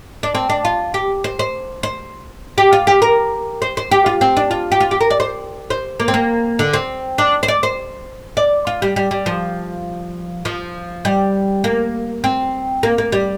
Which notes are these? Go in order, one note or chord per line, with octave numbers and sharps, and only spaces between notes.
D4
C4
D4
F4
G4
C5
C5
C5
G4
F4
G4
A#4
C5
C5
G4
F4
C4
D4
F4
G4
F4
G4
A#4
D5
C5
C5
A#3
C4
A#3
D3
C4
D4
C5
D5
C5
D5
F4
G3
G3
G3
F3
F3
G3
A#3
C4
A#3
A#3
G3